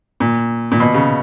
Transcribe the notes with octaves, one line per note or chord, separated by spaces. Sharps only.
A#2
A#2
B2
C#3